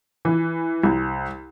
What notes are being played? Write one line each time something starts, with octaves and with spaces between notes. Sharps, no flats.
E3
C2